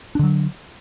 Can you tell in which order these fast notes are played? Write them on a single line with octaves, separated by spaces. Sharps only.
D4 D3 F#3